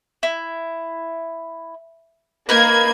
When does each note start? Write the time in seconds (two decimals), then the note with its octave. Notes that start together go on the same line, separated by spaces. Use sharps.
0.23 E4
2.49 A#3 D#4 A#4 B4 G#6